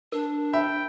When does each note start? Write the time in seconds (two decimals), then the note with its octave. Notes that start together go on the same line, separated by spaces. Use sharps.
0.12 D4 A#4
0.53 E5 G5 B5